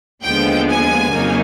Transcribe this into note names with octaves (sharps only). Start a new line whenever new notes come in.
D#2 D3 F3 G#3 B3 G5
G#5
F2 C#3 F#3 A#3 D#4